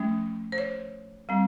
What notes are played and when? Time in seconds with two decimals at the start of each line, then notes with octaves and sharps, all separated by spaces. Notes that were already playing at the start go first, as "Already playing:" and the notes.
Already playing: F3 A3 C#4
0.52 C5
0.58 C#5
1.29 G3 C4